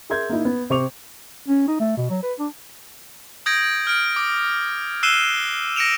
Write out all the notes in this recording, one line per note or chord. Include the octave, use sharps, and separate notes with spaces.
G#4 A#4 E5 C6 G6 G#6
A#3 D#4 E4
B3
C3 C5 C#6 D6 F7
C#4
D#4
A3
B2
F#3
B4
D4
D#6 G6 G#6 A#6 D7
F6 D7
D6
E6 F#6 C7 D#7 E7 G7
A#6 C#7 D7 E7 F7